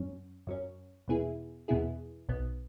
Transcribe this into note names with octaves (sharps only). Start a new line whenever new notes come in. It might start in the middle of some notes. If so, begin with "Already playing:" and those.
Already playing: F#2 F#3 C#4
F#2 F#3 C#4
E2 B2 B3 E4 G#4
E2 B2 B3 E4 G#4
B1 B2 B3